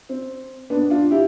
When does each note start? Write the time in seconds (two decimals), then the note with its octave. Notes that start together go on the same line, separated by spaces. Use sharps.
0.09 C4
0.70 B3 D4
0.90 D4 F4
1.11 E4 G4